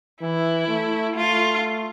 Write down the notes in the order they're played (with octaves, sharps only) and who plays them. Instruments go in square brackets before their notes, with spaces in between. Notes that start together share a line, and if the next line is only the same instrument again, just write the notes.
[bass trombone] E3 [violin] E4
[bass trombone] A3
[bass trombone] A3 [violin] F4